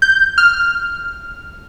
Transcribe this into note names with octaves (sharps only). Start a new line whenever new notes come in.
G6
F6